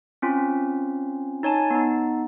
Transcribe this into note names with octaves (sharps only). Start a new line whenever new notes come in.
C4 C#4 F4
D#4 C#5 G#5 A5
B3 D#4